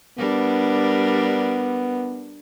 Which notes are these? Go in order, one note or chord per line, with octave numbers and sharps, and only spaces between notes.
G3 B3 D4 A#4